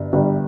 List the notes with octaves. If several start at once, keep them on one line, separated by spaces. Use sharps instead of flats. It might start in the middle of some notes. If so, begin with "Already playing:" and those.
Already playing: G1 G2
G1 G2 G3